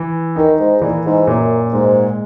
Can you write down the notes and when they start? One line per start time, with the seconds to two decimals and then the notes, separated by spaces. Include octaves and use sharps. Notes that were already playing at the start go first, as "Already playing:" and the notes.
Already playing: E3
0.36 D#3 D#4
0.59 G#2
0.81 A#2 E3
1.05 G#2
1.27 F#2 A#2
1.73 G#2 G#3